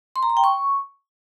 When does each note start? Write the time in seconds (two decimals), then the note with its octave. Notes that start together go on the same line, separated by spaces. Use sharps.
0.16 C6
0.23 A#5
0.30 C6
0.37 G5
0.44 C#6